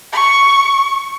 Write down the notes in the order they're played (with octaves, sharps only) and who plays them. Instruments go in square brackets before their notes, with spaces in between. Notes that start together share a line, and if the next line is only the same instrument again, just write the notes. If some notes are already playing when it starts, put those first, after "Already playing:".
[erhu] C#6